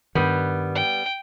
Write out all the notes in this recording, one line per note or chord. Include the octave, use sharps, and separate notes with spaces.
G2 D#3 G3 B3
G5